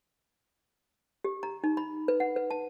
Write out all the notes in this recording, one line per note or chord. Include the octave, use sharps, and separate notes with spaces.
G4
A#5
D#4
B5
B4
F#5
B4
A5